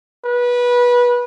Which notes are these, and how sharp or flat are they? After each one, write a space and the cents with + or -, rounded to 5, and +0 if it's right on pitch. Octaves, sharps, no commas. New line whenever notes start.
B4 -20